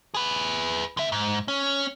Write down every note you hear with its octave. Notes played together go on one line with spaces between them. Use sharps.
G#4 B4
D3 E5
G#2
C#4